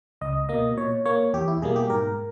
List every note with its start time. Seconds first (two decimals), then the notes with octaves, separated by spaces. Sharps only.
0.21 C#2 D#5
0.49 B2 A#3 D#5
0.77 A#2 C#5
1.05 A#3 C#5
1.34 E2 G4
1.48 E4
1.62 B2 G3 A#3 G#4
1.76 G4
1.90 G#2 A#4